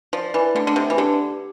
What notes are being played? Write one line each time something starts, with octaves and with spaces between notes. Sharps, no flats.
F3 D5
E3
D3 A3
D3
C3
E3
D3 G4